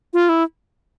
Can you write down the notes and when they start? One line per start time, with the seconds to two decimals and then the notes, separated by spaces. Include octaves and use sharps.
0.14 F4
0.29 E4